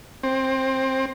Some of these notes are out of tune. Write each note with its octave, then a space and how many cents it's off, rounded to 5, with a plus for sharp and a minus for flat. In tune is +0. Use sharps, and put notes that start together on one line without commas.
C4 +20